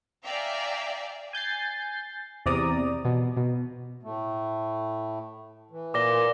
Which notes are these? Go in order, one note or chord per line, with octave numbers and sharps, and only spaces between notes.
D5 E5 F5 G5 G#5 A#5
G#5 G6 A6 C7
E2 C3 D5 A#5 D#6
B2
B2
A2 A3
E3
A#2 D6 A#6 G7